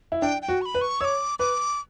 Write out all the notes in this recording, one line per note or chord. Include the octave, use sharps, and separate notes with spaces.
E4
D4 G5
G5
F#4
C#6
B5
B4
C#6
C#5 D6 E6
B4 D6